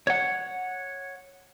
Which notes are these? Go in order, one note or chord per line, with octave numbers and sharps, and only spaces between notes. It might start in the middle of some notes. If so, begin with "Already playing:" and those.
C#5 F#5